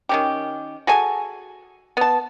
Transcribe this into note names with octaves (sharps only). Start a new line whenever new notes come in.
D#3 C#4 G4
F#4 G#4 A4 G#5
B3 A5